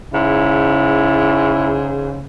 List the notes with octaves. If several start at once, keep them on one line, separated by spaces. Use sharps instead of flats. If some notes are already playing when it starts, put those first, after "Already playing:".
G#2 C#3 E4